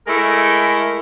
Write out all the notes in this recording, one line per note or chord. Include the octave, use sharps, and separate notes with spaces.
G#3 A3 E4 A#4